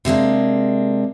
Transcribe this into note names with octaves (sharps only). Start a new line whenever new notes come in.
C3 G#3 A#3 D4